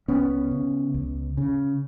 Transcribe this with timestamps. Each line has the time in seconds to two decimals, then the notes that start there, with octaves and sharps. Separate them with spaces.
0.08 C#2 B3 C#4
0.51 C#3
0.94 C#2
1.37 C#3